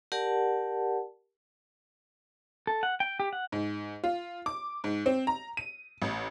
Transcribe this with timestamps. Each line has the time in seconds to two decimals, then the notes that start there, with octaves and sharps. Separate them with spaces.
0.12 G4 A#4 D5 F#5 A5
2.67 A4
2.83 F#5
3.00 G5
3.20 G4
3.33 F#5
3.52 G#2
4.04 F4
4.46 D6
4.84 G#2
5.06 C4
5.27 A#5
5.57 D#7
6.02 A1